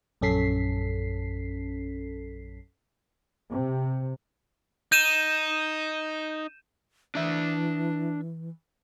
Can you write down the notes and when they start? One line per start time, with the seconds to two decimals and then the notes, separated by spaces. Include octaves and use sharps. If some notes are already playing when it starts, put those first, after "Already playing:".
0.21 A#1 F#2 C#4 A4 B6 C7
3.52 C3
4.92 D#4 G6 D#7 E7
7.15 E3 D4 E5